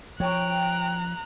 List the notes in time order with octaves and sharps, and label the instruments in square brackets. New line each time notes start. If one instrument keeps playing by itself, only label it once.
[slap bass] F3 [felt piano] C#5 C#6 [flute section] G5 [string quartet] A#5 F#6